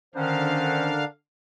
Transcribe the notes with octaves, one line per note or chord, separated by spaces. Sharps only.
D3 D#3 C#4 D4 A#4 C5 F5 F#5